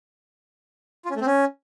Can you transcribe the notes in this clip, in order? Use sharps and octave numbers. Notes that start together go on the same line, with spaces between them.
F4
C#4
A3
C4
C#4